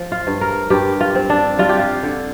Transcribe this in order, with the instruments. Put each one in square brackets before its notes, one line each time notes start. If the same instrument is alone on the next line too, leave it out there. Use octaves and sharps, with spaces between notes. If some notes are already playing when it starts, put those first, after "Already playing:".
Already playing: [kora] F3
F4
G2
A#4
G2 G4
F4
C4
D4
G3 F4
G4
F4
D3